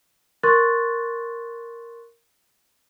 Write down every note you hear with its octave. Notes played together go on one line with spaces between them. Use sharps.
A#4 C6 C#6 F#6 A6